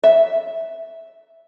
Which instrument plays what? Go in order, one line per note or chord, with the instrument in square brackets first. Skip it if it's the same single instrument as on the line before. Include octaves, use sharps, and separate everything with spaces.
[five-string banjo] E5